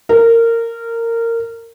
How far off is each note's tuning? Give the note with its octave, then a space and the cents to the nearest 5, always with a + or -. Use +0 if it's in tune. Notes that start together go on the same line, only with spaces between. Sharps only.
A#4 -20